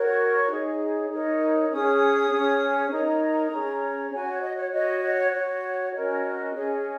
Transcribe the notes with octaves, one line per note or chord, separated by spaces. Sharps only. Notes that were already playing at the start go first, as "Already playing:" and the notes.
Already playing: F#4 A#4 C#5
C#6
C#6
D#4 G#4 C#5
D#4 A#4 C#5
C#4 G#4 C#5 D#6
C#4 G#4 C#5
D#4 A#4 C#5 A#5
C#4 G#4 C#5
F#4 C#5 G#5
C#5
D#5
C#5
F#4 C#5 D#5
C#5
F#4 C#5
C#4 F#4 A#4 C#5 D#5
C#4 G#4 C#5